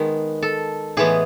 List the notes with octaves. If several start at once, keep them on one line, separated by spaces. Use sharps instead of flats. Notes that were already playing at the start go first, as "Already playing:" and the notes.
Already playing: D#3 G#3 B3
A4
A2 E3 G#3 B3 G#4